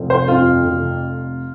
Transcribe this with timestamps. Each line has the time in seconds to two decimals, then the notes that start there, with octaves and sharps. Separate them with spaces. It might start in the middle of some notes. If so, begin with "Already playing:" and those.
Already playing: F1 F3
0.10 C5
0.28 F2 F4
0.64 F1